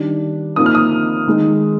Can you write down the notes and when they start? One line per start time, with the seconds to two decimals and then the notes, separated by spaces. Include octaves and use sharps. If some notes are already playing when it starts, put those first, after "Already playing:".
Already playing: D#3 G3 D4
0.56 F3 A#3 D#4 D#6
0.66 F6
0.75 D#6
1.27 D#3 G#3 D#4